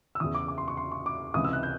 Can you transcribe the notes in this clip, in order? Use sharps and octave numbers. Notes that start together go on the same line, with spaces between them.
E6
E2 C#3 E3 D#6
D6
D6
C6
C#6
C6
C#6
D6
C#2 C3 E3 D#6
E6
F#6
G6